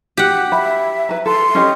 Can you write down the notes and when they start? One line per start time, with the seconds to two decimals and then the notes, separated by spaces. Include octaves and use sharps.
0.17 F#4 G4 F#5
0.52 E5 B5
1.09 B4 A#5
1.26 A4 C6
1.55 C#4 G4 D#5